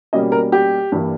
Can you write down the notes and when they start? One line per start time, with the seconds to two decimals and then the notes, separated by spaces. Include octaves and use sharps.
0.13 B2 G3 A#3 C#4 D#5
0.32 A#4
0.52 G4
0.92 G2 E3 G3 A#3